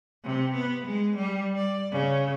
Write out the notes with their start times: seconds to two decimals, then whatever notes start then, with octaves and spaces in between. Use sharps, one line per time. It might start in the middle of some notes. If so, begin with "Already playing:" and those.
0.24 C3
0.54 B3
0.85 G#3
1.16 G3
1.56 D5
1.92 C#3